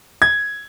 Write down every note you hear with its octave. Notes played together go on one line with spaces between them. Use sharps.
G#6